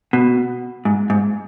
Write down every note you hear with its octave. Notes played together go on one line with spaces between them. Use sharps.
B2
G#2
G#2